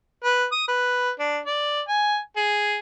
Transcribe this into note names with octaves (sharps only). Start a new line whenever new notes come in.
B4
D#6
B4
D4
D5
G#5
G#4